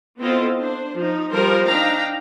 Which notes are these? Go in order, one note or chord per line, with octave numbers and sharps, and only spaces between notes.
B3 C4 E4 F4 A4 D#5
D4 C5
F3 D#4
F3 G3 F4 A#4 C5
D4 D#4 F5 G5 A#5